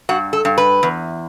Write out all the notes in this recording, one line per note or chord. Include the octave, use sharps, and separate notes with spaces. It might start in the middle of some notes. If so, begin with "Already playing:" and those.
G2 F#4
A4
G2
B4
E2